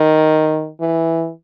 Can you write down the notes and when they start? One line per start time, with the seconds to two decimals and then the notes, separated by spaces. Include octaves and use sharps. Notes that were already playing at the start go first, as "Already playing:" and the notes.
Already playing: D#3
0.80 E3